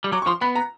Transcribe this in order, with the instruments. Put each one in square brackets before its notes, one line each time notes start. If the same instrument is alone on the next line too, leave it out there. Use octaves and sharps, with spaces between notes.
[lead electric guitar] G3
[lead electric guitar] F#3 [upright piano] D6
[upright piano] C#6
[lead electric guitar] F3 [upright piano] C6
[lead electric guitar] B3 [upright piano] B5
[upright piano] A#5